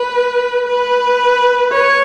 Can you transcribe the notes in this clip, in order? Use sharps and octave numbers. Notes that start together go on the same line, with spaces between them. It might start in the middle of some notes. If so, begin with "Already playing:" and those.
Already playing: B4
B4
C#5